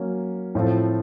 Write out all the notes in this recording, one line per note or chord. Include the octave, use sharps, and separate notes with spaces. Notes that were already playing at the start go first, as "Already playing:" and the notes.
Already playing: F#3 A#3 C#4
A2 F3 C4 F4 A4